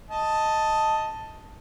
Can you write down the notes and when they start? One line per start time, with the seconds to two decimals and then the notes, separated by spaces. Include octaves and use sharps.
0.09 D#5 A5